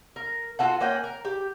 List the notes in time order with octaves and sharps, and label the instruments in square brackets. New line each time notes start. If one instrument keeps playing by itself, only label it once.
[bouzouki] A#4
F4 F#4 A4 F#5
A#3 C#4 F#5 G5
A#4
G4